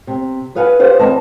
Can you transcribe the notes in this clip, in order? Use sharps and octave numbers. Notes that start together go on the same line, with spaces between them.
C3
E4 G#4 B4 F5 F#5 G#5
G4 C5 F5 F#5
F#2 E3 C4 D#5 F5 A5